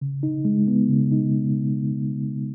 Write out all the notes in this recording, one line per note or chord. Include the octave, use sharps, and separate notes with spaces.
C#3
D#4
G#3
B3
C#3
D#4